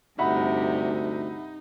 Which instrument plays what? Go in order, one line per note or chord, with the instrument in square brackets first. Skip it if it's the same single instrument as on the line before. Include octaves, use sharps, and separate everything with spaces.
[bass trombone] D2 [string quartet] G2 C3 [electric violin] D#4 [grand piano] E5 F#5 B5